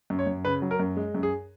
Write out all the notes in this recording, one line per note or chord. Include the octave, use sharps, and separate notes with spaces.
F#2
C#5
F#2
C#3 B4
F#3
A#4
F#2
G#3
F#2
G#4